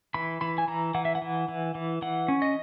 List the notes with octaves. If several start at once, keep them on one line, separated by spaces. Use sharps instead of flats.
E3 B5
E3 B5
G#5
E3 A#5
E3 F#5
E5
F#5
E3
E3
E3
E3 F#5
C#4
D#5